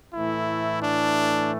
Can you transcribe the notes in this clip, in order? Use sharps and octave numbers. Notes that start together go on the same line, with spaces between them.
A2 E3 A3 E4
D4